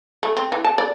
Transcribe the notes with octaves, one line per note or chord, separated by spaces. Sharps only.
A3
C4
E3
A5
D5